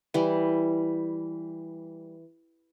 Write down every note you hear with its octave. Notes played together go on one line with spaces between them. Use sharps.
E3 G3